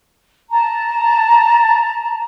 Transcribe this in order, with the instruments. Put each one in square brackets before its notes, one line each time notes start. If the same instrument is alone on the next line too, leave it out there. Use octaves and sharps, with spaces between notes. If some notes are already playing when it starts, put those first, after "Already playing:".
[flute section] A5 A#5